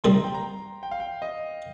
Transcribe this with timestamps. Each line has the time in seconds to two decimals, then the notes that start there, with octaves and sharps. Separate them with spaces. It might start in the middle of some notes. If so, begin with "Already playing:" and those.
0.04 C3 D#3 G3 D#4 C6
0.14 A#5
0.24 G5
0.34 A#5
0.83 G5
0.91 F5
1.00 G5
1.22 D#5